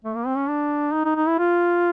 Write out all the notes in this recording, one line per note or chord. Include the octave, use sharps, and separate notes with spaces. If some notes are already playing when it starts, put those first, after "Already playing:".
A3
A#3
C4
C#4
D4
D#4
D#4
D#4
E4
F4